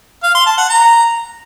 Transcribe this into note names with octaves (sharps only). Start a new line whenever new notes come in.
F5
C6
A5
F#5
A#5